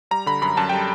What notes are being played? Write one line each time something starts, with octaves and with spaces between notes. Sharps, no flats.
G3 A#5
D3 B5
F#2 B5
F#2 A5
G5
G3